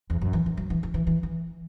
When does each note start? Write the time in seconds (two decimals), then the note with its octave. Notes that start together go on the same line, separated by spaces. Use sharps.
0.10 E2
0.21 F#2
0.33 E3
0.46 E3
0.57 F#3
0.70 E3
0.83 E3
0.94 E3
1.07 E3
1.23 E3